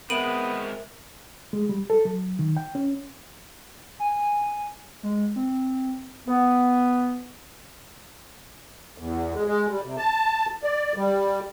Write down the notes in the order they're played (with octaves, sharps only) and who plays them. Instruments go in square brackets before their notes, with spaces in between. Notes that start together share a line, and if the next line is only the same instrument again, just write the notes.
[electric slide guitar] G#3 C4 [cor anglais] B3 [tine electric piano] A#4 E5 [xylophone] D7 D#7 F#7
[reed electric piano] G#3
G3
A4
F#3
D#3
G5
C#4
[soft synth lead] G#5
G#3
C4
[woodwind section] B3
[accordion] E2
G#3
G#3
G3
C3
A5
D5
G3